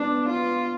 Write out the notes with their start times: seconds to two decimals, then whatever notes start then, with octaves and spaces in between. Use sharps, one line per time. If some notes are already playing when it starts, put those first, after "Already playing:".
Already playing: B3 D4
0.30 F4